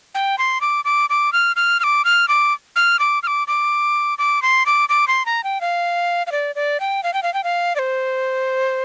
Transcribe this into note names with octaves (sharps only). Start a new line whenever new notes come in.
G5
C6
D6
D6
D6
F6
F6
F6
D6
F6
D6
F6
D6
F6
D6
D6
D6
C6
D6
D6
C6
A#5
G5
F5
F5
D5
D5
G5
F5
G5
F5
G5
F5
D5
C5